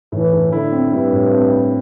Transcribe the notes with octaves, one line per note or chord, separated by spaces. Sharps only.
A2 E3
A2
D3 E4
C4
G2 E4
A2
C4
E4